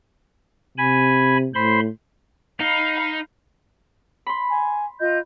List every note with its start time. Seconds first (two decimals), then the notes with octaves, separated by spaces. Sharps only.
0.78 C3 G#5 B5
1.54 A2 C5 B5 C6
2.60 D#4 F5 B5
4.27 B5 C6
4.50 G#5
5.00 F4 D#5 G6